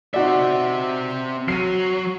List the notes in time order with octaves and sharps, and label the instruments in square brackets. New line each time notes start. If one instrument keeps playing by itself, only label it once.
[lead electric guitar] C4 E5 [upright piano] D#4 F#4 D5
[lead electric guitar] F#3 [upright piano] C7 D#7